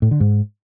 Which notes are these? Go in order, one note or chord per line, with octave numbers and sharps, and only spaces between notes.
A2
D3
G#2